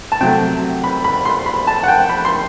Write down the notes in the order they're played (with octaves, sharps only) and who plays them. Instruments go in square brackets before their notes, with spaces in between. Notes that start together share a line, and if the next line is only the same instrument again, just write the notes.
[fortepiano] A5
C3 F#3 A3 G5
B5
B5
C6
B5
A5
F#5
G5
B5
C6